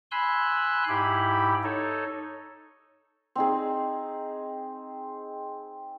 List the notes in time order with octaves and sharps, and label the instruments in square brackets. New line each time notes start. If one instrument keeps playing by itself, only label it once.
[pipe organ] G#5 B5 C6 E6 F#6
G#2 E4 G4 B5
D#4 A4 C#5
[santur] C4 D#4 G#4